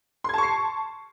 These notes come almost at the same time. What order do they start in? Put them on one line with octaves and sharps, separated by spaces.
C6 G#6 A5 C#6 C7